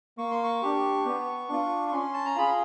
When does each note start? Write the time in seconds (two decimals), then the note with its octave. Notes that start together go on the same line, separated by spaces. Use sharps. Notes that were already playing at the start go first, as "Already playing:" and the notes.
0.18 A#3 C#6
0.31 C6
0.44 C#6
0.62 D4 G4
1.05 B3
1.49 D4 F4
1.88 C#6
1.93 C#4 C6
2.14 A5
2.26 A#5
2.36 F4 G#4 B5